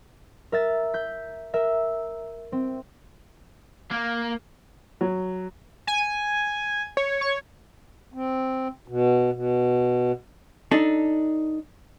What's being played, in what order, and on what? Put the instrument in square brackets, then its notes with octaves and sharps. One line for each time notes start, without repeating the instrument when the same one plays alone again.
[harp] A#4 E5 A6
G6 B6
A#4 E5
C4
[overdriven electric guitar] A#3
[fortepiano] F#3
[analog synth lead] G#5
[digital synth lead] C#5
[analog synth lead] C#6
[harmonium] C4
B2
B2
[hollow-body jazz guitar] D4 D#4 A4